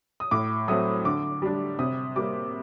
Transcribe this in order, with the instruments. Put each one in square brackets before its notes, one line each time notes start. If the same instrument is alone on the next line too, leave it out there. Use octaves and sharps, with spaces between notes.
[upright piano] D#6
A2 D6
F#3 A3 C4 D#6
D3 D6
G3 D4
C3 D#6
G3 A#3 D6